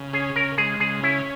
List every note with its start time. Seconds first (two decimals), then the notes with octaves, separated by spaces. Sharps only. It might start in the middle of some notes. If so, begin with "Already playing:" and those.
Already playing: C#3
0.13 C#4 G#4
0.36 C#3 A#4
0.58 G#3 G#4
0.80 C#3 G#4
1.03 C#4 E4